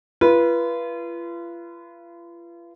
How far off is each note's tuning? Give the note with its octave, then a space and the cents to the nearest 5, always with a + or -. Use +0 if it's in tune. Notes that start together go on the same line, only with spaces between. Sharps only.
F4 -40 B4 -20